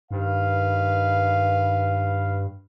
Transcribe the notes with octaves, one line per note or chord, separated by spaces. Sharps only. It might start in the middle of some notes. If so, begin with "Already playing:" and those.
G2 D#3 B4 F5